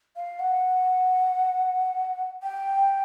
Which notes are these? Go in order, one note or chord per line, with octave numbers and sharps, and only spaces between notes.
F5
F#5
G5